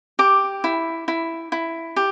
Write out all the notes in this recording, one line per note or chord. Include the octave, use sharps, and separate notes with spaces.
G4 D6
E4
E4
E4
G4